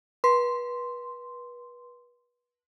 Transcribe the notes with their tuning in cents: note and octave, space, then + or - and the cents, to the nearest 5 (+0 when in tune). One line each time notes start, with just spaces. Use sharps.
B4 -30 C6 -5